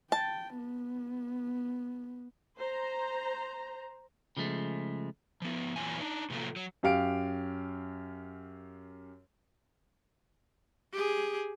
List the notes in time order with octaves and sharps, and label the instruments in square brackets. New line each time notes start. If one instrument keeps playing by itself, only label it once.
[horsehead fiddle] G5 [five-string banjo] A5
[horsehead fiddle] B3
[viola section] C5 A#5
[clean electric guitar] C#3 F3 G#3 A3
[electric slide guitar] F3 B3
E2 A#2 E3 F#3 C4 G#5
D4 D#4
A2 C3 F3 F#3 A3 A#3
F#3
[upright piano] F#2 G4 F5 D7
[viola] G4 G#4